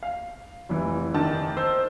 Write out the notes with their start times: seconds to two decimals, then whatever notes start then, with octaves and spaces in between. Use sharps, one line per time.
0.03 F5
0.69 F1 E3
1.14 D#3 D4 A5
1.57 C5 E6